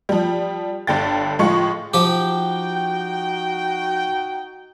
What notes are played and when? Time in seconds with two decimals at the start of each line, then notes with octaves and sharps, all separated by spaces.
0.09 F3 G3
0.87 G1 G2 D3 G5 A6
1.39 A2 F3 G#3 F4 C#6 C#7
1.94 F3 D#4 F#4 G4 G5